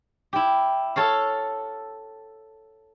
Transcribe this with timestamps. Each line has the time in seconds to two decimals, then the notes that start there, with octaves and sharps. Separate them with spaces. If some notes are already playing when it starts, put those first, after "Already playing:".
0.33 E4 G4
0.96 A4 C#5 F5